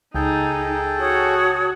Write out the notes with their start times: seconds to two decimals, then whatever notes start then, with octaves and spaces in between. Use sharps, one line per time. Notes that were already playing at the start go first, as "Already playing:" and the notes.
0.15 C#2 D#4 G#4 A4 G5 G6
1.00 F#4 C#5 A5 D#6